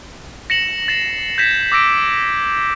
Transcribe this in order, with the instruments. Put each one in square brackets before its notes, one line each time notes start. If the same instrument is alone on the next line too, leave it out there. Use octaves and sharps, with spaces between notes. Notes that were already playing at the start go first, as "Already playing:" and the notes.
[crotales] A#6 C#7 E7 F#7
A6 C7 E7
G6 G#6 A#6 B6 E7
D6 E6 A#6 D7